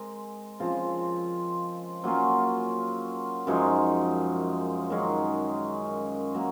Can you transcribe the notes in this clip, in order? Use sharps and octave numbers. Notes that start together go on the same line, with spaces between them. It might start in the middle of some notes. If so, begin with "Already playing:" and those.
Already playing: G#3 C4 A#4
C#3 F3 C4 F4
F#3 A#3 C#4 F4
F#2 F3 G#3 D#4
F#2 D#3 G#3 C#4
F#3 A#3